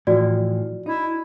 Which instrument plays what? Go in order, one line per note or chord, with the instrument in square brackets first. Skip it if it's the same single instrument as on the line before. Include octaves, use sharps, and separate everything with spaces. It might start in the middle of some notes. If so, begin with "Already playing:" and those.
[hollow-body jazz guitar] A2 E3 F3 [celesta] F#4 D5
[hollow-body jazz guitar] D#4 [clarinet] E4